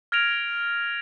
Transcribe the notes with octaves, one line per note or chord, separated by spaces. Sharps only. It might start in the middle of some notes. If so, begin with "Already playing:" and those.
F6 G#6 A#6 D7 F7